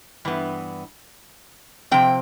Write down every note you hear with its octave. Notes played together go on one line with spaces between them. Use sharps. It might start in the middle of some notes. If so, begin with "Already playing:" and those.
G2 E3 B3
C3 F3 C4 G5